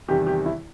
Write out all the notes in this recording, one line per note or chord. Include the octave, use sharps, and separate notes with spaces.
E2 C3 D#3 G3 G4
G4
E4